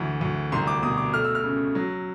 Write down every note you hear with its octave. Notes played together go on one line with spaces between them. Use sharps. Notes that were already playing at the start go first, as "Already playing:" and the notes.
Already playing: D2 E3
D2
C2 C6
D6
B2 D#6
D6
A3 F6
E6
F6
C#3
F#3